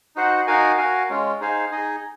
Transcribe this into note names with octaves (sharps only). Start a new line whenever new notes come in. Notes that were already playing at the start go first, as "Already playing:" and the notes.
D#4 F#4 C5 F#5
D#4 F#4 A#4 F5 G#5
F#4 A#4 F5 G#5
G#3 C#4 F4
D#4 G#4 C5 F5 G#5
D#4 G#4 D#5 G#5